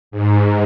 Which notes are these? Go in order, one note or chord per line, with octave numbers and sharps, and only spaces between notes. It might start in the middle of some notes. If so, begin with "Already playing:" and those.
G#2